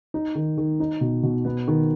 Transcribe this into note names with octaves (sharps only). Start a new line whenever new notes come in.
D#4
D#3
D#3
D#4
B2
B2
B3
D#3